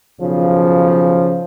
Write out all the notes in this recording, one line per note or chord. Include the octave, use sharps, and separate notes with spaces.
B1 C#3 F3